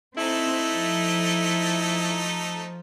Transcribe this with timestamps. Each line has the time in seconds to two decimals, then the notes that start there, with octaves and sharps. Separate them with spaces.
0.17 A3 C4 D#4 E4 A4
0.67 F3